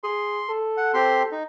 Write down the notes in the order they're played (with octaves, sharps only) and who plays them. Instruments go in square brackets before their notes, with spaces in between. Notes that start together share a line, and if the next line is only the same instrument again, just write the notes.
[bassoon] G#4 [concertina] C6
[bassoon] A4
[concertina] F#5
C4 G4 C6
D#4